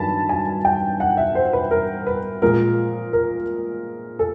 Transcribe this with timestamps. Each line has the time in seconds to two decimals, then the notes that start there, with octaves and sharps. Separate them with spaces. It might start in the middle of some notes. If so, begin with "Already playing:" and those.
Already playing: G2 D#3 F#3 A5 B5
0.29 G#5
0.65 G5
1.00 F#5
1.17 E5
1.35 C5
1.53 B4
1.71 A#4
2.07 B4
2.42 A#2 F3 G#3 A#4
3.13 A#4
4.19 A4